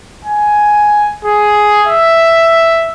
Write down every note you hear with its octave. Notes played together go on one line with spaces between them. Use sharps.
G#5
G#4
E5